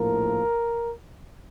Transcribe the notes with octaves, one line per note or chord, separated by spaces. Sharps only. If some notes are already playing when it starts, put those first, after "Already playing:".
Already playing: A#1 A2 F3 A#3 A#4